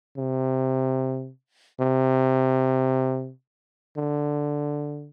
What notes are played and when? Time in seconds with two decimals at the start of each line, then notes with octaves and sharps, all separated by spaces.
0.17 C3
1.80 C3
3.97 D3